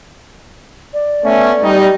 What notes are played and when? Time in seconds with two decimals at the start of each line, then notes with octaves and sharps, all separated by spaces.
0.94 D5
1.24 A3 B3 C#4
1.63 G3 D#4